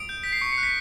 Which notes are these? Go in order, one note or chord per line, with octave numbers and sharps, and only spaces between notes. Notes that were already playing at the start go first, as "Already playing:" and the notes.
Already playing: D#6 D7
G6
G6 B6
C7
C#6 C#7
C#7
F#6
B6